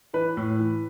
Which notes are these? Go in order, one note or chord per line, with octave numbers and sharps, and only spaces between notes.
E3 B4
A2
E3